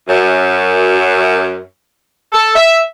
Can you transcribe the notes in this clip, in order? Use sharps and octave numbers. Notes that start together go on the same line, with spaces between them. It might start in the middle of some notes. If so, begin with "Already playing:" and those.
F#2
A4
E5